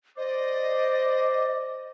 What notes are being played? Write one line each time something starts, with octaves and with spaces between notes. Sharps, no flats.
C5 D5 D#5